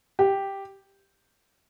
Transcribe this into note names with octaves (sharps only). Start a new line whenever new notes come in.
G4